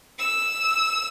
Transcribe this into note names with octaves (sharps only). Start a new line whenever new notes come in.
E6